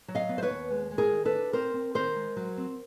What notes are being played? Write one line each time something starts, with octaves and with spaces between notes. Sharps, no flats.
F#3
D#5 F5
B3
C5
B4 C#5
D#2
G#3
G#3
G#4 A#4
D#3
A4 B4
D4
C4 A#4 C5
C4
D#3 A#4 C5
G#3
F#3
C4